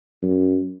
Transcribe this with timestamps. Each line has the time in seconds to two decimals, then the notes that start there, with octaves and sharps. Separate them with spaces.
0.23 F#2